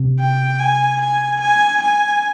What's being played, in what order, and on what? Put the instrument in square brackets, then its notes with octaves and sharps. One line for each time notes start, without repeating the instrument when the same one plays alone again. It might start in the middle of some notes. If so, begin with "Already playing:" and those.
Already playing: [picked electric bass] C3
[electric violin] G5
G#5
G#5
G#5
G#5